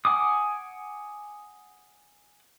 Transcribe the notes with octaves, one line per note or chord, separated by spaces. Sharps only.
F#5 G#5 D6 D#6